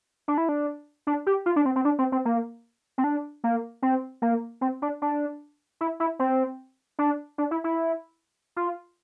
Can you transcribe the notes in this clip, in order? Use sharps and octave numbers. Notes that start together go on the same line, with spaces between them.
D4
E4
D4
D4
G4
F4
D4
C4
C4
D4
C4
C4
A#3
C4
D4
A#3
C4
A#3
C4
D4
D4
E4
E4
C4
D4
D4
E4
E4
F4